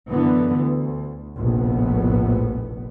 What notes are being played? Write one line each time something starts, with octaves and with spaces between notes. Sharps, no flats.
F#2 D3 E3 B3
D2
F1 A#1 A2 B3